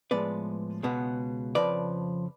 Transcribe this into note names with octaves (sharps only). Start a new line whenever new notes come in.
A2 F3 G#3 B3 B4 D5
C#2 B2 G#3 B3
F2 C#3 F3 B4 D5